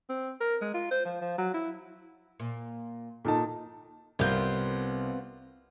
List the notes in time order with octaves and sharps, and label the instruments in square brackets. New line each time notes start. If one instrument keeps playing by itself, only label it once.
[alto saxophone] C4
A#4
G#3
F4
C5
F3
F3
F#3
E4
[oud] A#2
[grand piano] A#2 A5 [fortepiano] D#4 A4
[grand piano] C2 A#4 G6 [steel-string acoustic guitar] B3 C4 F4